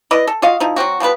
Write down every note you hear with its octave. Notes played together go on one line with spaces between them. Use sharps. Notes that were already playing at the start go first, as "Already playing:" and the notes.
E4 B4 D5 D#5
A4
F4 F#4 D#5 F5
F3 D#4 E4
F#3 G#3 C4 F#4
F3 G3 B3 B4